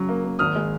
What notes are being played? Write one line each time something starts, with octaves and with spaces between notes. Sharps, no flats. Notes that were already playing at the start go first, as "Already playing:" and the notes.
Already playing: C#3 F#3
A#3
A#3
G#1 D#6 F6
G#3